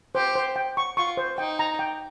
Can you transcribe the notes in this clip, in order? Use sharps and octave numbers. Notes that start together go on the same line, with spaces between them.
G4 C5
C5
G5
C#6
F4 C#6
C5
D#4 G5
A#5
G5